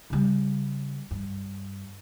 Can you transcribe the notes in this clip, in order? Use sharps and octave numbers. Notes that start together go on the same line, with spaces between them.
C#3 G3
G2